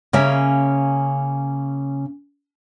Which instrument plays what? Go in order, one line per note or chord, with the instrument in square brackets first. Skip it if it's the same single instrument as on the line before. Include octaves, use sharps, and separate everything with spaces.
[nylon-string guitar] C#3 A#3 C#4 E5